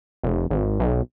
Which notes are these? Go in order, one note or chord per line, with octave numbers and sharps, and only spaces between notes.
F1
G#1
B1